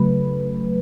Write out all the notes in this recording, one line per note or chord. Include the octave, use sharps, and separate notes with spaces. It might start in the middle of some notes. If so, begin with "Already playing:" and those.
Already playing: C#3 F#3 A3 B4